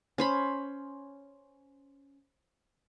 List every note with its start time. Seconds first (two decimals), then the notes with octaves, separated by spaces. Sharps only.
0.18 C#4 C5 B5